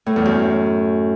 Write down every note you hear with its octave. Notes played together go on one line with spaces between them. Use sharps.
A2
E2
F#2